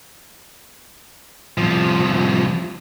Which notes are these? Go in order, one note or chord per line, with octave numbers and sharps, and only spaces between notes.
C2 F3